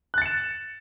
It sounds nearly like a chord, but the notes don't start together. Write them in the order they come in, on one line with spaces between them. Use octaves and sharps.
F#6 A6 C#7 E7